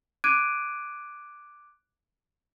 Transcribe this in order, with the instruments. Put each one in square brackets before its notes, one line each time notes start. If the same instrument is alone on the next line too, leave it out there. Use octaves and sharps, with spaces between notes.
[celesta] D6 F#6 G#6 D7 D#7